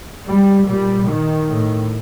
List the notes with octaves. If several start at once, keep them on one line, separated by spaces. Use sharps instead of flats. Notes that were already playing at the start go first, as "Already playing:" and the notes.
G3
A#2 G3
D#3
A2